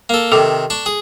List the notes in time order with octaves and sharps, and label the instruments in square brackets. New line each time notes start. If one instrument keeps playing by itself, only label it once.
[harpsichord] A#3 A4
[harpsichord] C3 D#3 [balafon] A4 D6
[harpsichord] D4 C#6
G#4